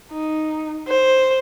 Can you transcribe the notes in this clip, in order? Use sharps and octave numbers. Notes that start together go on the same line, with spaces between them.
D#4
C5